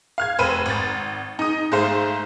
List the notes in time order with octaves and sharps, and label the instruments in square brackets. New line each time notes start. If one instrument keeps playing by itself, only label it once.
[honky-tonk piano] F5 F6 G#6
F1 B4 C5 D#7
G#1 A6
D#4 D#6
G#2 A3 C5 F5